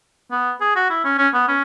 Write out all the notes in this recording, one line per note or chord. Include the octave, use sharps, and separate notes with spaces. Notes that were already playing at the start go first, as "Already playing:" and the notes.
B3
G#4
F#4
E4
C#4
C#4
B3
C#4